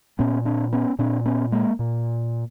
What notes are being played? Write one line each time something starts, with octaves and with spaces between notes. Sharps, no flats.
A#2 B3 C#4
C4 D4
B3 C#4
A#2 C4 D4
B3 C#4
G#3 A#3
A#2